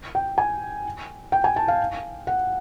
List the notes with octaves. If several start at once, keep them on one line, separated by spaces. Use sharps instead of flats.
G5
G#5
G5
G#5
A5
F5
F#5